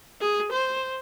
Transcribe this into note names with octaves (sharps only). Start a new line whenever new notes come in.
G#4
C5